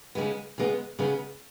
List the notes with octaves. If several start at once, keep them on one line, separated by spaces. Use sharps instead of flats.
C#3 G#3 B3
C#3 G#3 B3
C#3 G#3 B3